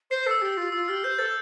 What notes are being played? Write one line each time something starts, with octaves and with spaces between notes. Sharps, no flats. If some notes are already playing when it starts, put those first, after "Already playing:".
C5 C7
A4 E6
G4
E6
F4
F4 E6
G4 F6
C5 G6
A4 A6